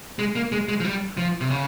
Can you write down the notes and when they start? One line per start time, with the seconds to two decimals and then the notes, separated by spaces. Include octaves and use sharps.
0.19 G#3
0.35 A#3
0.52 G#3
0.69 G#3
0.80 F3
0.84 G3
1.17 F3
1.41 C3
1.50 C#3